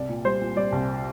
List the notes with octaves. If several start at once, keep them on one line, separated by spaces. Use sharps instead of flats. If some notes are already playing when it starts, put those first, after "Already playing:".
Already playing: C2 D5
A#2
G3 C5
A#2
G3 D5
C2